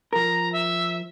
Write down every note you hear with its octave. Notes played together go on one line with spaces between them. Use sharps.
F3 A#4 A#5
E5